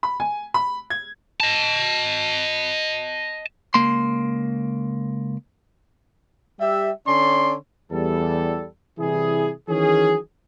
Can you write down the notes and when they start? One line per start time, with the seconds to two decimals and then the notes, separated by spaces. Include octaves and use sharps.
0.03 B5
0.20 G#5
0.54 B5
0.90 G#6
1.40 D#5 A5
3.74 C#2 A#3 C6
6.60 G3 G4 E5
7.07 D3 C#4 C#5 D5 C6
7.91 E2 G3 A4
8.98 C3 E3 G3 E4 G#4
9.68 D#3 E3 F#3 C#4 G#4